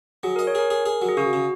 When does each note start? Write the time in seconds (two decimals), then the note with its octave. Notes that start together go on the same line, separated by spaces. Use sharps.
0.23 F#3 G#4
0.36 A#4 D#5
0.47 C#5
0.55 G#4 A#4
0.70 G#4
0.86 G#4
1.02 F#3
1.09 G#4
1.17 C#3 F#4
1.33 C#3